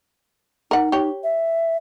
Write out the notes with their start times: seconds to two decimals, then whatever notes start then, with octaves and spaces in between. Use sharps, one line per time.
0.71 D#4 A#4 F#5
0.92 G4 C#5
1.24 E5